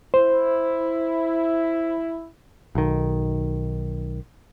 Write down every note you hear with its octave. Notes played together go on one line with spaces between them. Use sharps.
E4 C5
B1 D#3